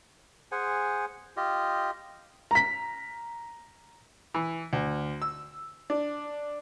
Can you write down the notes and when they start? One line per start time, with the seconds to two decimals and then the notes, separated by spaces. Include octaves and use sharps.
0.52 G#4 C5 F#5 G#5
1.37 F4 G4 D#5
2.51 A#5 B6
4.34 E3
4.73 D2
5.22 E6
5.90 D4